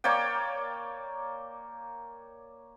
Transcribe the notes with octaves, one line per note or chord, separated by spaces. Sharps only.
A#3 C#5 D5 G5